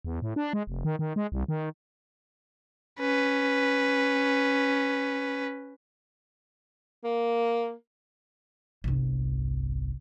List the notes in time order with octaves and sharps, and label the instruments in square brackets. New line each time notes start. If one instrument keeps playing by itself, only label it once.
[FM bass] E2
A2
D4
G#3
F1
D#3
D#3
G#3
C2
D#3
[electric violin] C#4 B4
[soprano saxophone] A#3
[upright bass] G1 C2